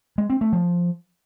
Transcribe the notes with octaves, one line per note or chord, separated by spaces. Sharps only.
G#3
C4
A3
F3